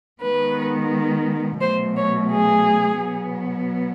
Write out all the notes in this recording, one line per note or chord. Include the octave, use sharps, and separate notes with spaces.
D#3 G#3 B3 B4
B2 F#3 A3 C5
C#5
G#4
B2 F#3 B3